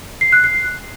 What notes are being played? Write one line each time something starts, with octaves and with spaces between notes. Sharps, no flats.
C7
F#6
C7